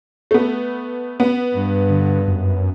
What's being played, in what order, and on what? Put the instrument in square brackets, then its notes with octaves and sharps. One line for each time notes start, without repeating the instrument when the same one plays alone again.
[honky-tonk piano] A3 B3
B3
[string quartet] G2
[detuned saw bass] D3
F#2